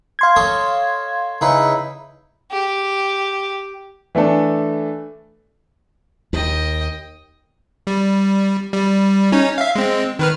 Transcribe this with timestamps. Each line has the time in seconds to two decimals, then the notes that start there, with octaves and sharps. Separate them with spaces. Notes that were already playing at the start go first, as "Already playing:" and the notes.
0.19 F5 C6 G#6
0.36 A4 C#5 D#5
1.41 C#3 D#4 E4 B4
2.51 G4
4.15 E3 A3 D4 A4
6.33 D#2 D#5 G5
7.87 G3
8.73 G3
9.32 C#4 D#4 C#5
9.58 E5 F5
9.75 G#3 C4
10.19 D#3 B4 F6